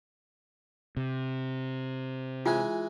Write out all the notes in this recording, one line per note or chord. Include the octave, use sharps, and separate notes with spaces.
C3
E3 G#3 F4 G#5